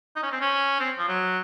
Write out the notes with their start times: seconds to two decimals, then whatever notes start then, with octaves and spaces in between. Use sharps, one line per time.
0.16 D#4
0.23 C#4
0.32 C4
0.41 C#4
0.80 C4
0.99 F3
1.08 F#3